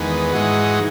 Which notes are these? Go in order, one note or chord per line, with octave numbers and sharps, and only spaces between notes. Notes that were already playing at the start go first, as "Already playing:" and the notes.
Already playing: E2 D#3 G#3 B3
G#2 E3 G#3 D#4 F#4